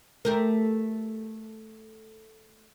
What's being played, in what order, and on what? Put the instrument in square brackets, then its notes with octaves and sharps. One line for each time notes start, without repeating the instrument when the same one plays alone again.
[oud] A3 G4 A#4